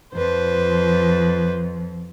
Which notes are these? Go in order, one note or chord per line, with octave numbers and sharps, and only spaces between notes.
F2 F3 B4 C5